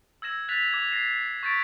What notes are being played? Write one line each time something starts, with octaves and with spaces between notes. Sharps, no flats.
E6 G#6 A#6 E7
F#6 A6 B6 F7
D6 G#6 F7
A#6 C7 E7
C#6 G6 A6 B6 D7